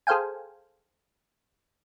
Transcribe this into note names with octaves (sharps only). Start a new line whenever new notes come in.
G#4 A4 C5 F5 G5 G#5